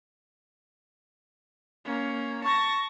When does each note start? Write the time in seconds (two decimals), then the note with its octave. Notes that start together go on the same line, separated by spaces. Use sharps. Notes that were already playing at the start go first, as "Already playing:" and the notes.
1.85 A#3 C#4
2.44 A5 C#6 A#6